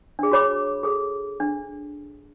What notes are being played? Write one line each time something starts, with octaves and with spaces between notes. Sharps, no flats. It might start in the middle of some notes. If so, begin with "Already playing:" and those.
D4 G#4
F#4 G#4 C#5 B5 D6
G#4 A4
D4